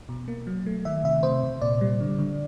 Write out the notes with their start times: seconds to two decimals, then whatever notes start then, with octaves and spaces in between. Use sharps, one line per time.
0.09 B2
0.28 A#3
0.47 F#3
0.66 A3
0.85 D#3 E5
1.04 C3 E5
1.23 C3 C5
1.43 C3
1.61 A#2 D5
1.81 G3
2.00 D3
2.19 D3